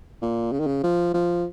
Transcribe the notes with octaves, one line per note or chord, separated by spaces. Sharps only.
A#2
C#3
D#3
C#3
F3
F3